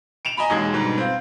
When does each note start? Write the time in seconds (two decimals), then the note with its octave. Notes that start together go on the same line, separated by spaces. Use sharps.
0.25 D7 E7 F7
0.37 D#5 G#5 A#5 B5
0.50 E1 D#2 G#3 G#6
0.73 G#2 B2 D3 G3
0.98 C4 F4